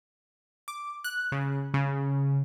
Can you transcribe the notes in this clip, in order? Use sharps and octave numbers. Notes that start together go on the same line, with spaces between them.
D6
F#6
C#3
C#3